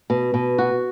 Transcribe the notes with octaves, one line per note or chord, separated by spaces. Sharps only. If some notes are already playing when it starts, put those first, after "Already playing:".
B2
B2
F#4